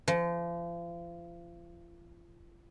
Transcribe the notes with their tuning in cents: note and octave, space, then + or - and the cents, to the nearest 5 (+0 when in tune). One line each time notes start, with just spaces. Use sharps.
F3 -35